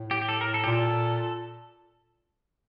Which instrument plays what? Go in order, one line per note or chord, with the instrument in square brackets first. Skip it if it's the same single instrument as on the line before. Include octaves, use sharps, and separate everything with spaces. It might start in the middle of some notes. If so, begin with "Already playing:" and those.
Already playing: [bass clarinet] A2
[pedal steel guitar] G4
G4
A4
A#4
A4
[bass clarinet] A#2 [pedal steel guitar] G4
[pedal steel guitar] A4